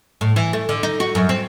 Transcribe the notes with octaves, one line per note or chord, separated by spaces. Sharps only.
A2
E3
A3
D3
D#4
F#4
F#2
C4